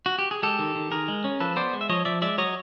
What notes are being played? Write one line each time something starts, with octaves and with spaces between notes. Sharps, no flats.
F#4
G4
G#4
G#3 G4 A4
D#3
D#3
D#3 G#4 A#4
G#3
C#4
F3 A4 B4
B3 C5 D5
G#3
E5
F3 C#5 D#5
F3 D5 E5
G#3 D5 E5
F#3 C#5 D#5